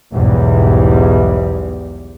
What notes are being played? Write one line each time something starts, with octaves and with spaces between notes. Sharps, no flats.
B1 E2 G#2 G3